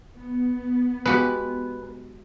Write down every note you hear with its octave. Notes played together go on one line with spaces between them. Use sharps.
B3
G#3 F#4 G4 B4